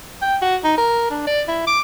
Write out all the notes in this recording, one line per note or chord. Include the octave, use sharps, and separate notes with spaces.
G5
F#4
D#4
A#4
D4
D5
E4
D6